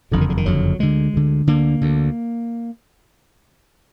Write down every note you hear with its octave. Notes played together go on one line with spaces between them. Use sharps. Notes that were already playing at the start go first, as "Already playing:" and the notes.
F#1 F2 D3 F3
D#3
D3
D#3
F#1 F2 D3 F#3
D2 D3 G#3
D2 D3
D2 D3 A#3
D2 D3